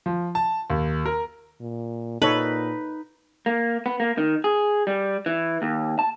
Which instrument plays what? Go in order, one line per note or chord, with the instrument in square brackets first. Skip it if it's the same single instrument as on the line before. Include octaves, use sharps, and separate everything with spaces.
[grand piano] F3
A5
D#2
A#4
[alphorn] A#2
[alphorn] A#2 [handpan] D#4 [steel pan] A4 C#5 [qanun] B4
[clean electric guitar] A#3
B3
A#3
D#3
G#4
G3
E3
D#2
A5